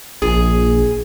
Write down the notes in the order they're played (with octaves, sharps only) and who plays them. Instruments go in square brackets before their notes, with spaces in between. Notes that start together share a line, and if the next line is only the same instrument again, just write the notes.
[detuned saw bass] A#1 [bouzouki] G#4